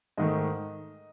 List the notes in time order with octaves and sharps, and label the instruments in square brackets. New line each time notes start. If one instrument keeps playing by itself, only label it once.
[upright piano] G#2 D#3 A3 D#5